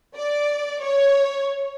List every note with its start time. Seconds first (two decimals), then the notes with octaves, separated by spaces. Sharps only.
0.16 D5
0.83 C#5